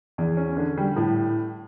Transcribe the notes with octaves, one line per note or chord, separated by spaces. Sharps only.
E2
C#4
D3
G3
A2